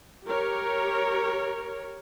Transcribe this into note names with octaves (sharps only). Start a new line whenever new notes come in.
G4 A#4 C#5